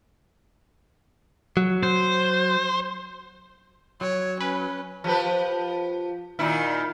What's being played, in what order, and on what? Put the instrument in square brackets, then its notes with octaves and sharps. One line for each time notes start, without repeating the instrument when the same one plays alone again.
[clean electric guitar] F#3
[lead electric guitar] C5
[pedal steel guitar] F#3 [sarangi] C#5
[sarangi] C#4 [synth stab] B4
[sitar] F3 G4 B4
A#2 D#3 E4